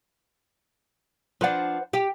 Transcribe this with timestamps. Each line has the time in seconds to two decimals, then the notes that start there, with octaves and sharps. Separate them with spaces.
1.41 F3 D4 B4 C5 F#5
1.93 G4 G5